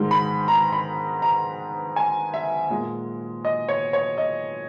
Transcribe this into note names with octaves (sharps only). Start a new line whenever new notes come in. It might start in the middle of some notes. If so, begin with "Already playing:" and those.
Already playing: G#2 D#3 G#3
B5
A#5
B5
A#5
G#5
E5
A#2 G#3
D#5
C#5
C#5
D#5